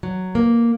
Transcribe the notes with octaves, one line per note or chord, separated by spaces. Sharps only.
F#3
A#3